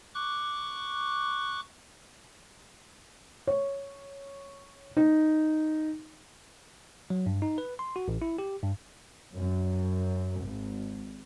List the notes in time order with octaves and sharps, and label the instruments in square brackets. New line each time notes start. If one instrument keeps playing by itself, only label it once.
[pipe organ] C#6 D6 F#6
[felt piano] C#5
D#4
[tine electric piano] F#3
G2
D#4
B4
C6
F#4
A1
E4
G4
G2
[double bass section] F#2
G#1